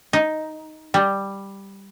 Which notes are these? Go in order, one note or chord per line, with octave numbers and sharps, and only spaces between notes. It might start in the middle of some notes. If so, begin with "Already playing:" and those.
D#4
G3